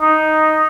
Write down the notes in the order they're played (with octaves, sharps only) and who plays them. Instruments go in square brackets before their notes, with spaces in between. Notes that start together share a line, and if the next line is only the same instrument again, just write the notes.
[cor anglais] D#4